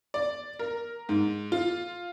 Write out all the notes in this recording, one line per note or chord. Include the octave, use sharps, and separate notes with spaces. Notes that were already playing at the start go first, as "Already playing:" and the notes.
D5
A#4
G#2
F4